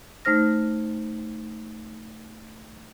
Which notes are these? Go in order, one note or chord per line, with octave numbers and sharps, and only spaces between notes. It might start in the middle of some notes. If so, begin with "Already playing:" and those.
A3 D#4 C5 F6 A#6